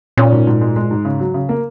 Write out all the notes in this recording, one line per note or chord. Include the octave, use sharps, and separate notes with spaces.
A#2 C#4
G#2
G#2
G#3
G#3
G#2
C#3
F#3
C#3
A#3